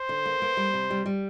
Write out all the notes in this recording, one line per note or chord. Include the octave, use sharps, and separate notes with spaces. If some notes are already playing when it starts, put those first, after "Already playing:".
Already playing: C5
D3
A#3
A#3
G3
C3
G3
G3